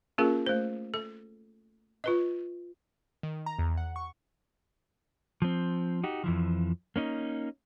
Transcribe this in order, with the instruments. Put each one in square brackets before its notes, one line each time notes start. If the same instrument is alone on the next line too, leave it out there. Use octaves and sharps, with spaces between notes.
[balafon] A#3 C#4 F4 G#4 A#4
A3 C5
A4
F4 B4 D#5
[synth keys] D#3
A#5
E2
F#5
C#6
[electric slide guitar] F3 C4
D#4 F#4 G4
F2 E3 F3
A#3 C#4 D#4